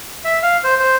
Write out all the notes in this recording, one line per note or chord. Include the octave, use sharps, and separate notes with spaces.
E5
F5
C5
C5